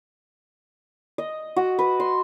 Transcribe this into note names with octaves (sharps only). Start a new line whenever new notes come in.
D#5
F#4
B4
C6